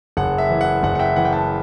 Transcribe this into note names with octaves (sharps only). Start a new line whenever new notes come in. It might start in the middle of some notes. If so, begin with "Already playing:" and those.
F#1 F#5
E5
E3
F#5
F#1 F#5
F#5
E5 G5
E3 F#5
G5
F#5 A5